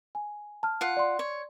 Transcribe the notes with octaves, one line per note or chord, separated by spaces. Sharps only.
G#5
A5 F6
F4 F#5
D5 C6
C#5